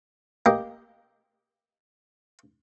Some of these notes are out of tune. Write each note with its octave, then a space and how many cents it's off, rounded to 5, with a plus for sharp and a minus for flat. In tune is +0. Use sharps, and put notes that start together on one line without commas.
A#3 +0 G4 +0 D#5 +5